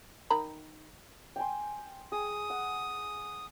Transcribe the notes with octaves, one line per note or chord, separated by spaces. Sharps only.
D#3 A#5 B5
G5 G#5 C6
G#4 D#6
F#5